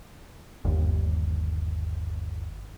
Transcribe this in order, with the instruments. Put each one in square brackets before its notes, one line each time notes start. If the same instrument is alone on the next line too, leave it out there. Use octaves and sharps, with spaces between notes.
[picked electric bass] G1 D#2